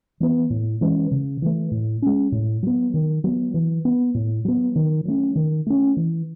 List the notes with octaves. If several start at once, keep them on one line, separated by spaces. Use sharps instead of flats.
E3 B3
A2
E3 G#3 C#4
C#3
E3 A3
A2
G#3 C#4
A2
F#3 B3
D#3
F#3 B3
E3
B3
A2
F#3 B3
D#3
F#3 A3 C#4
D#3
A3 C#4
E3